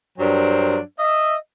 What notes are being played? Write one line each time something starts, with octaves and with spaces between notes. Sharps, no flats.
G2 F#3 D4 A#4 C5 G5
D#5 E5